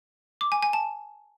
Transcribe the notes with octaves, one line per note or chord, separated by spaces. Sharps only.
D6
G#5
G#5
A5